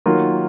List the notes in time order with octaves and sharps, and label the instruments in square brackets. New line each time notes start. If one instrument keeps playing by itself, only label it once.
[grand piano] D#3 F#3 A#3 F4